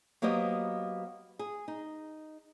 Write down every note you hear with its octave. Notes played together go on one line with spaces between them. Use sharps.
F#3 A#3 B3 G4 C5 D#5
G#4
D#4